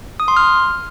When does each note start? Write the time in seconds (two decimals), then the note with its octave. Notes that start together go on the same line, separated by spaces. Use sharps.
0.20 D#6
0.28 C6
0.37 F6